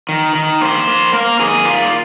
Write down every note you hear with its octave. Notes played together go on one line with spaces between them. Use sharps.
D#3
D#3
A#3 C5
A#3
A#3 A#4
D#3 G#4
A#3 F4